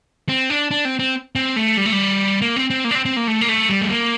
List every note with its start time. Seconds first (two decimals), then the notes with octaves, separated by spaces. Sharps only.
0.29 C4
0.50 D4
0.71 D4
0.85 C4
0.99 C4
1.35 C4
1.56 A3
1.77 G3
1.85 A3
1.92 G3
2.42 A#3
2.56 C4
2.70 C4
2.85 A#3
2.91 D4
2.95 C4
3.05 C4
3.17 A#3
3.27 A3
3.41 A#3
3.49 A3
3.69 G3
3.81 A3
3.90 A#3